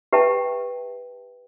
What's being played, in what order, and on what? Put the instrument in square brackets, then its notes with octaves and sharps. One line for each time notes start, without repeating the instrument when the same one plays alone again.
[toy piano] G4 B4 E5 G5 A5